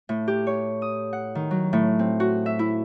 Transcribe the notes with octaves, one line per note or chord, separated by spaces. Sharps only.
A2
G4
C#5
D#6
F#5
D#3
F#3
A2
C4
F#4
E5
E4